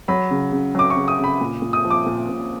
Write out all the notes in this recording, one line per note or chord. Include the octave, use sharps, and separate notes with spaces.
F#3 B5
C#3
C#3
F#3 D6
C#6
C#3
D#6
C#3 B5
A#2
A#2
D#6
F3
D6
A#2
A#2